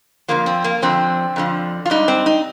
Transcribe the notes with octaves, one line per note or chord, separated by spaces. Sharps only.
F2 D3 F3 A#3
C4
A#3
F2 D3 F3 C4
F2 D3 F3
F4
G#2 G3 D#4
C4
D#4